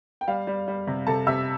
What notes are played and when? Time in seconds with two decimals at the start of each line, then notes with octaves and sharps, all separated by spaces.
0.21 G5
0.28 G3 F5
0.47 G3
0.68 G3
0.87 C3
1.07 C3 A4 A5
1.27 C3 E5 E6